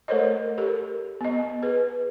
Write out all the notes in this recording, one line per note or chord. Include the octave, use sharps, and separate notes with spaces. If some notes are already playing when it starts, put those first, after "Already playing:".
A3 A4 A#4 C5 C#5 D#5
G4 A4 A#4
B3 D#5
G#4 B4